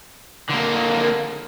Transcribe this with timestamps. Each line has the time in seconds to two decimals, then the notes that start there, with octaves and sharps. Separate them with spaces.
0.49 D3 A#3